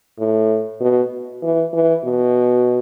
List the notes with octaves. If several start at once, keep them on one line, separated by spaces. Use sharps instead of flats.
A2
B2
E3
E3
B2